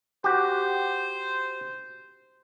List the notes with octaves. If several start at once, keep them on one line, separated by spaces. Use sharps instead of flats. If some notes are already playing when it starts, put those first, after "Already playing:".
F#4 G4 C5